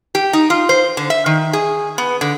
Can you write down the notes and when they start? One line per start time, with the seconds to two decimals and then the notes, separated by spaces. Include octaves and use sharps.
0.15 G4
0.33 D#4
0.50 F4
0.69 C5
0.97 D3
1.10 E5
1.26 D#3
1.53 G#4
1.98 B3
2.21 D3